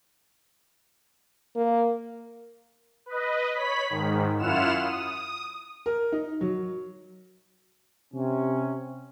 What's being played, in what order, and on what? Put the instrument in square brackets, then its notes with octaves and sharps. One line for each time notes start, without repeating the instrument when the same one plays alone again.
[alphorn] A#3
[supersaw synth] B4 D#5
C#5 B5 B6
G#2 D#3
F#2 E4 F4 F#5 F6 E7
D#6
[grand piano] A#4
D#4
F#3
[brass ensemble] C3 C#4